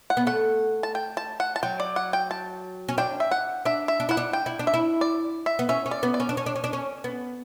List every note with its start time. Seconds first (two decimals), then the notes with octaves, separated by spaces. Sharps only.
0.10 F#5
0.17 B3
0.27 A3 F#5
0.83 A5
0.95 G5
1.17 A5
1.40 F#5
1.56 A5
1.63 F#3 G5
1.80 D5
1.96 F#5
2.13 G5
2.31 A5
2.89 C#4
2.98 D4 G5
3.20 E5
3.31 F#5
3.65 D4 E5
3.88 E5
4.00 D4
4.09 E4 F#5
4.17 D4
4.33 G5
4.46 E4
4.59 D4
4.67 E5
4.74 E4
5.01 D5
5.46 E5
5.59 B3
5.69 C#4 E5
5.86 C#4
5.91 D5
6.03 B3
6.14 D5
6.20 C#4
6.29 D4
6.37 C#4
6.46 D4
6.56 C#4
6.64 D4
6.73 C#4
7.04 B3